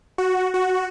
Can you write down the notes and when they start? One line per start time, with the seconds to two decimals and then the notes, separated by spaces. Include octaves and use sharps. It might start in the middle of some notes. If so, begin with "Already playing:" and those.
0.18 F#4
0.54 F#4